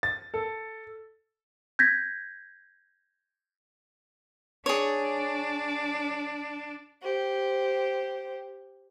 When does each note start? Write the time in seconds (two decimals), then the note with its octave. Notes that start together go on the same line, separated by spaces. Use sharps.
0.03 A6
0.34 A4
1.79 G6 G#6 A#6 B6
4.66 D4 G#4 C#5
7.02 G4 C5